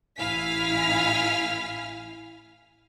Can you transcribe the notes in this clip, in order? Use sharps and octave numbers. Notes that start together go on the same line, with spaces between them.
A1 E4 F5 G#5 F6 B6